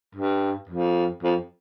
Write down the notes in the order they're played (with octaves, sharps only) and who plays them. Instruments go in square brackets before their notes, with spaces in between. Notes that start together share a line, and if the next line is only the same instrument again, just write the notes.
[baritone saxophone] G2
F2
F2